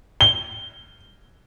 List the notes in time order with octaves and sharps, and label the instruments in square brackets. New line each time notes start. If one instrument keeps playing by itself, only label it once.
[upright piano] G7